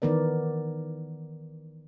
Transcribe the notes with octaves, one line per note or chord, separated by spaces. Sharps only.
D#3 E3 B3 A#4 D5